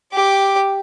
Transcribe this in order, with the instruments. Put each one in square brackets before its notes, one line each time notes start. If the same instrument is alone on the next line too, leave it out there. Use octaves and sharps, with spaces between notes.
[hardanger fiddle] G4 D6